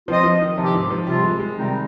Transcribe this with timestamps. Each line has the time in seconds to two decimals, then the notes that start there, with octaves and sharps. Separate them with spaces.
0.08 F3 C4 F4 C5 D#5
0.24 F3
0.41 D#3
0.57 C3 F3 C4 G4
0.74 G#2
0.90 F3
1.07 C3 F3 G3 C4 F4
1.24 G#3
1.40 G#3
1.56 C3 D#3 G3 C4 D#4